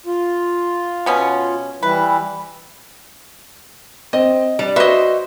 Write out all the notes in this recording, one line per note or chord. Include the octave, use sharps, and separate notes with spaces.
F4
B2 B3 C#4
E3 G3 E4 B4
C4 D#5
G3 D4
F#4 B4 C5 D#5 E5